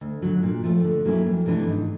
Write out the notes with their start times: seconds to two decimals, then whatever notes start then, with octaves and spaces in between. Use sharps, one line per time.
0.01 D2
0.22 D3 F#3
0.43 A#2
0.64 F3 A3
0.84 D3
1.05 F#3 A#3 C#4 E4
1.26 F2
1.46 C3 E3 A3 D4
1.67 G#2